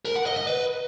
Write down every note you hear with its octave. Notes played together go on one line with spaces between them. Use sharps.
A#4
F#5
D#5
D#5
B4